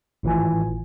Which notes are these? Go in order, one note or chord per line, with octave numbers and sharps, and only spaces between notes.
G#1 A2 E3 F4 G#5